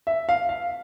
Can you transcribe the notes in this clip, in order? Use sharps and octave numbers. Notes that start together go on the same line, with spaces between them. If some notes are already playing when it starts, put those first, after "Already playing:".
E5
F5
F5